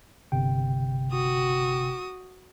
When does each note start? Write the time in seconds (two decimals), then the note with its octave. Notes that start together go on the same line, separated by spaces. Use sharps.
0.32 G1 C3 G5
1.12 F#4 D#6